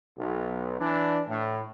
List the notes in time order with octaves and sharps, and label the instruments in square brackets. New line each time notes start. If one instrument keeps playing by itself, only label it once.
[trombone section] B1
E3 D4
A2